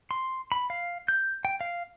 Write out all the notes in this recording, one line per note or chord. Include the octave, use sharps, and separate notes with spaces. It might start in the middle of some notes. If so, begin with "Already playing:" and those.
C6
B5
F5
G6
G5
F5